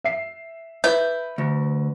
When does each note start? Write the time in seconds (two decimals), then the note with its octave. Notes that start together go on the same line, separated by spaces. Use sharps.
0.04 E5 C7
0.84 E4 B4 G6
1.38 D2